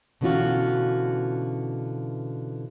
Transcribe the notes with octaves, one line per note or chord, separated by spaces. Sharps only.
B2 D3 E3 C#4 F4 F#4